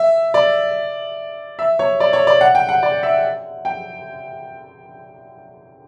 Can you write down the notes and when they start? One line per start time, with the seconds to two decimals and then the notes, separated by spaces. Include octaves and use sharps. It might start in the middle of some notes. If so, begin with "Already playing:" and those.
Already playing: E5
0.34 D5
1.59 E5
1.79 C#5
2.00 D5
2.13 C#5
2.27 D5
2.41 F#5
2.55 G5
2.69 F#5
2.83 D5
3.03 E5
3.65 G5